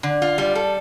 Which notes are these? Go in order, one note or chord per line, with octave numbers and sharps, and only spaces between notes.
D3
F4
G3
A4